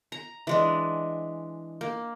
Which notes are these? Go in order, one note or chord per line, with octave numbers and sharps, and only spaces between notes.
A#5
E3 G#3 D4
A#3